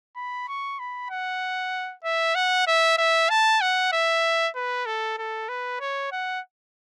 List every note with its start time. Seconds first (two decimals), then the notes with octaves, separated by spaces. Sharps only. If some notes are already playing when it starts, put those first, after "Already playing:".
0.16 B5
0.48 C#6
0.79 B5
1.10 F#5
2.04 E5
2.35 F#5
2.67 E5
2.98 E5
3.30 A5
3.61 F#5
3.92 E5
4.55 B4
4.86 A4
5.18 A4
5.49 B4
5.80 C#5
6.12 F#5